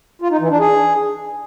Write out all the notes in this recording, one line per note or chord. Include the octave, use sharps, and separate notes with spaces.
F4
D#4
E3
D4
G#4